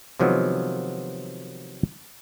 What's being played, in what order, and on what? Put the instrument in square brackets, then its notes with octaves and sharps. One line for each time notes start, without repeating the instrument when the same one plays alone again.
[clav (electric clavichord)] C3 D#3 F3 F#3 G#3 B3